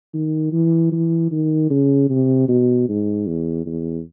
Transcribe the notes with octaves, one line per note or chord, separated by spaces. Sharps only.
D#3
E3
E3
D#3
C#3
C3
B2
G#2
E2
E2